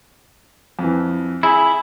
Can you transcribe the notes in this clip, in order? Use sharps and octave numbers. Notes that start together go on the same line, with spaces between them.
F2 E3
E4 G#4 E5 G#5